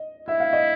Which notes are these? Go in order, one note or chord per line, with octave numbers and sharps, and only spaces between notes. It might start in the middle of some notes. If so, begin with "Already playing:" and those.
Already playing: D#5
E4 E5
F5
D#5